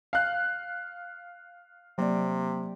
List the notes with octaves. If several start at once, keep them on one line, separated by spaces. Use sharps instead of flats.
F5 F#6
C3 F#3 A#3 D5